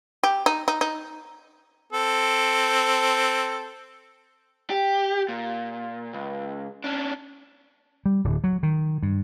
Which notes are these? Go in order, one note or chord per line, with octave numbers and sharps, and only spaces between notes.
G4
D#4
D#4
D#4
C4 A4
G4
A#2
C#2
C#4 D4
G3
D1
F#3
D#3
G2